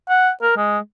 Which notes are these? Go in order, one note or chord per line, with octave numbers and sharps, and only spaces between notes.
F#5
A#4
G#3